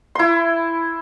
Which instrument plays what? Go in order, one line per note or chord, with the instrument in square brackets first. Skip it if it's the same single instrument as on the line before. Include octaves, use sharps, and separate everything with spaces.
[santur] E4 C6